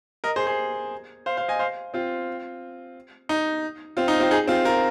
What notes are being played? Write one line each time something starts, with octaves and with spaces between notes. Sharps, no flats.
A#4 D#5
G#4 C5
G#4 C5
C5 F5
C5 F5
D#5 G#5
C5 F5
C4 F4
D#4
C4 F4
D#4
C4 F4
D#4 G#4
C4 F4
F4 A#4